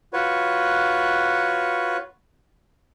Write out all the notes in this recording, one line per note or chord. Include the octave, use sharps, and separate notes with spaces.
F4 F#4 B4 C#5